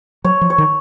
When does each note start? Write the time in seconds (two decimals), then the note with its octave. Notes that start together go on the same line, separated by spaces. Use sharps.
0.24 F#3 C#5
0.41 F3
0.50 C#5
0.58 D#3